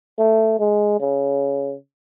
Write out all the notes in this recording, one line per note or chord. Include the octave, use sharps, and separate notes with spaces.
A3
G#3
C#3